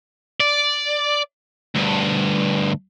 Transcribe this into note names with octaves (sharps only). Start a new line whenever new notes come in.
D5
D2 G2